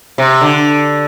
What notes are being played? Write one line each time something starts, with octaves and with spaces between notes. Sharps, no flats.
C3
D3